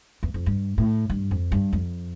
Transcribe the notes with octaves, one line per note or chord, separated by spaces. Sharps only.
E2
F2
G2
A2
G2
F2
G2
F2